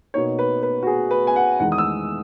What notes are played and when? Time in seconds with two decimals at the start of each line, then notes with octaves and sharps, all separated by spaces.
0.14 B2 A#3 D#4 C#5
0.39 B4
0.63 B4
0.83 F#4
0.87 G#4
1.11 B4
1.27 G#5
1.36 F#5
1.60 E2 D#3 G#3 D#4 F#5
1.72 D#6
1.78 E6